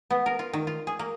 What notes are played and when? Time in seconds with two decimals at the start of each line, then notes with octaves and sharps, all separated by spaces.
0.11 B3
0.26 A#4
0.39 F4
0.53 D#3
0.67 F4
0.87 G#4
0.99 A#3